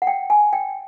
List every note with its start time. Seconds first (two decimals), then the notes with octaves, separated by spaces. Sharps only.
0.02 F#5
0.07 G5
0.30 G#5
0.53 G5